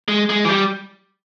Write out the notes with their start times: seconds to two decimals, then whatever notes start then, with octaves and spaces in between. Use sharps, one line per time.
0.08 G#3
0.30 G#3
0.45 E3
0.49 G3